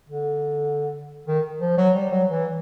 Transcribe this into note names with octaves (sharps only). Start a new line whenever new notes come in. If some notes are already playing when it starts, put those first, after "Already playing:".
D3
D#3
F3
F#3
G3
F#3
E3